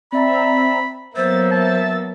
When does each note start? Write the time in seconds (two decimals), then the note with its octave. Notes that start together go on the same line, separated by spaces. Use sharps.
0.12 C4 D5 E5 A#5 B5
1.16 F#3 A#3 B3 C5 E5 A6
1.51 E5 A5 E6 A6